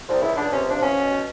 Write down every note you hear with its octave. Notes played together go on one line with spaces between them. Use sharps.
C2
C#2 E4
C#2 D4
C3 C#4
F3 D4
E2 C#4
B2
B2